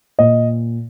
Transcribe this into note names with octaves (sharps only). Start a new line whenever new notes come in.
A#2 D#5